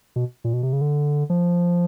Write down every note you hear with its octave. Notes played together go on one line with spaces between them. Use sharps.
B2
A#2
B2
C3
C#3
D3
F3